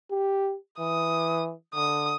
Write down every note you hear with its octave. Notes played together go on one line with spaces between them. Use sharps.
G4
E3 D#6
D3 D#6